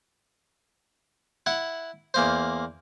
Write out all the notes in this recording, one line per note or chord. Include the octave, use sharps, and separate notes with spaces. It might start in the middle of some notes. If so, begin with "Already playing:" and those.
E4 F#5
E2 A#3 C5